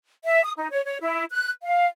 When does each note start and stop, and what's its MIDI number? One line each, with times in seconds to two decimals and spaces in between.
0.25 0.42 76
0.45 0.53 87
0.57 0.67 63
0.71 0.84 73
0.85 0.97 73
1.02 1.24 64
1.31 1.50 90
1.62 1.87 77